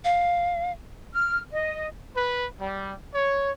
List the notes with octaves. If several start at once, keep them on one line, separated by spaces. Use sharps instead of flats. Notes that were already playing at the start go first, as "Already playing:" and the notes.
F5
F6
D#5
B4
G3
C#5